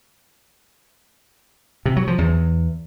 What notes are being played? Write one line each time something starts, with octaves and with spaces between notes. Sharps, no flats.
C3
F#3
F3
E2